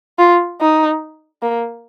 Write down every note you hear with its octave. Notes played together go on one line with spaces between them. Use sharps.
F4
D#4
A#3